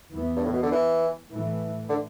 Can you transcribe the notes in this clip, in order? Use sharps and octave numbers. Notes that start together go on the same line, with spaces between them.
E2 E3 B3
G2
A2
B2
D3
E3
A2 E3 A3
D3